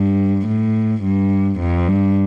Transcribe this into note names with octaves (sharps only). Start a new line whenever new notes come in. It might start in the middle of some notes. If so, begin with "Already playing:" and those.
Already playing: G2
A2
G2
F2
G2